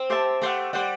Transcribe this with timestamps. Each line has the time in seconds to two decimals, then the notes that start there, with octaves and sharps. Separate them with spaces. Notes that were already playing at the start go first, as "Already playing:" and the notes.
Already playing: C4
0.10 G4 C5 E5 A5
0.41 A3 G4 C5 F#5
0.73 G3 G4 C5 F#5